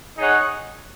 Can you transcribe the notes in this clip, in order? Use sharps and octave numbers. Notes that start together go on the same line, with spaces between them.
D#4 G#4 C#5 F#5